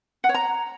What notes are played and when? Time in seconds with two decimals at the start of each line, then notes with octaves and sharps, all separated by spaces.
0.24 F#5
0.29 C#5
0.34 A#5